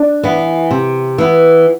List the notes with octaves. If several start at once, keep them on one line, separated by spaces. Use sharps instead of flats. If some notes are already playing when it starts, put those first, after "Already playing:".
Already playing: D4
E3 B3
C3
E3 B3